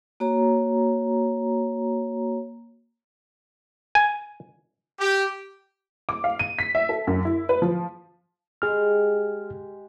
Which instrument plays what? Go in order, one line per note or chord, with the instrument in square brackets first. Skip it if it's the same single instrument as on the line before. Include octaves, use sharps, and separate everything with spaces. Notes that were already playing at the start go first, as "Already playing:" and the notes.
[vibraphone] A#3 F#4 C#5 A#5
[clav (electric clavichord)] G#5
[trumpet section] G4
[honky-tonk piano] D6
F5
D#7
B6
E5
A4
F#2
E4
B4
F3
[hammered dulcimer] G#3 G4 [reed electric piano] G#4 F6